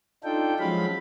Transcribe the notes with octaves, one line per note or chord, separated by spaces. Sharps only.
D4 D#4 F4 A4 G5
F3 F#3 G#3 C#4 F5 B5